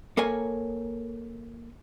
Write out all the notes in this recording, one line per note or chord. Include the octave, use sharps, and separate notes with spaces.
A#3 A4 A#4 C#5 G#5